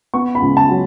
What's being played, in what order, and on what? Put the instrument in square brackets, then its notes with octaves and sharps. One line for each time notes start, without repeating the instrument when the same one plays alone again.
[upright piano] B3 C#6
B5
C#2
A5
F#3